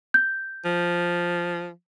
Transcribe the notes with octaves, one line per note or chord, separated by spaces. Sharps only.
G6
F3